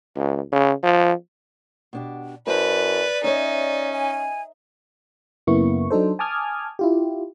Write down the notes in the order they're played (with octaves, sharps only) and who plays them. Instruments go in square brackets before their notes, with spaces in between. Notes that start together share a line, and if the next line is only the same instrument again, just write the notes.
[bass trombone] C#2
C#3
F3
[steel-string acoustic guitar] B2 D4 G4
[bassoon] F#2 [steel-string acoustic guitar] E4 C5 A5 [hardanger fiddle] B4 [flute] D5
[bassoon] C#4 [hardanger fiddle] D#4 [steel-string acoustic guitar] C#5 D#5 E5
[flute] G#5
[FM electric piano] F#2 C#3 A#3 B3 E4 C#6
F#3 D4 D#4 A4 C5
G#5 A5 D6 D#6 F6 G#6
E4 F4 G4